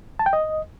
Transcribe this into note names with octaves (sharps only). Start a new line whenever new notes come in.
A5
G5
D#5